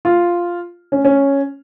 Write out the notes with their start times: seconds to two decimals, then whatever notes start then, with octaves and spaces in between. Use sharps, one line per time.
0.05 F4
0.92 C#4
1.05 C#4